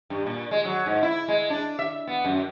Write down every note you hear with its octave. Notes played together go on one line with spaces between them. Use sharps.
G2
A#2
G#3
F#3
G#2
E4
G#3
D4
E5
B3
F#2